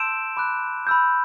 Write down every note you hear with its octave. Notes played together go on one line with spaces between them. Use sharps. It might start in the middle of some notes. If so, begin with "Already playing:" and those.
Already playing: A5 C6 E6 G6 D7 E7
B5 D6 F#6
B5 E6 G6